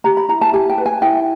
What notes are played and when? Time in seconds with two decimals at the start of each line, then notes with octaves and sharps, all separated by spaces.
0.04 G4 A#5
0.17 B5
0.29 E4 A#5
0.41 A5
0.53 G4 G#5
0.69 G5
0.78 B4
0.86 G#5
1.02 E4 G5